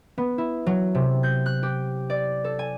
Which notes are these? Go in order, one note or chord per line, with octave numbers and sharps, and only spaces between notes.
B3
E4
F#3
C3
G6
F#6
G4
D5
A4
G#5